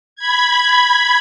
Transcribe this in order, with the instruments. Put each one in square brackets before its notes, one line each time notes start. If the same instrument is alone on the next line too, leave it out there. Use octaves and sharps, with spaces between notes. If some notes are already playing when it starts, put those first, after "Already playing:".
[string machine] B5 G#6